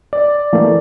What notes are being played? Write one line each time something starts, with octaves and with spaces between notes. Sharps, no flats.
D5
E3 A3 A#3